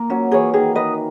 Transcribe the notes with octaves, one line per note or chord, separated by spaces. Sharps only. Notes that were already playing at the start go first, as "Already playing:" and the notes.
Already playing: A#3
F#3 C#4
E3 G#4 C#5
D#3 G#4
B4 D#5